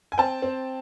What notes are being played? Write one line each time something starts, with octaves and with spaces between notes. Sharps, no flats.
G#5
C4 G5 A5
C4